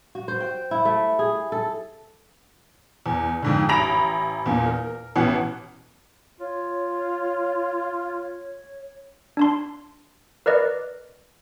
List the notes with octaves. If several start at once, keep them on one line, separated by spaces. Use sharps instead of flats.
F#4
C5
G5
E4
A3
G#4
A4
E2
F2 G#2 D3
A1 A#5 B5 A#6 D7 F7
E2 A#2
A#4
A1 B2 E3 C#4 F#5
F4 C#5
D4 A5 C6
A#4 B4 D5 D#5